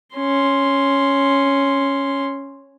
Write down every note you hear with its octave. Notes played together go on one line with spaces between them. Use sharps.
C#4 C6